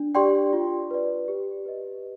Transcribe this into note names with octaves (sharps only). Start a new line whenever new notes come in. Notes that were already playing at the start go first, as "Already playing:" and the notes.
Already playing: D4
G4 D5 G5 C6
F4
B4 D5
G4
B4 D#5